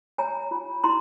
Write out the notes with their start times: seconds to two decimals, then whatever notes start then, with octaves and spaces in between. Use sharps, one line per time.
0.18 C#5 G#5 A#5
0.51 F4
0.84 E4 A#5 C6